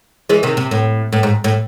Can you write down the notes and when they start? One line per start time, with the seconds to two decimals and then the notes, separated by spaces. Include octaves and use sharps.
0.29 E3 G#3
0.43 C3 D#3
0.57 C3
0.71 A2
1.13 A2
1.23 G#2
1.44 A2